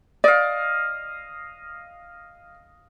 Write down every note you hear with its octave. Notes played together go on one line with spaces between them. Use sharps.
D5 D#5 F5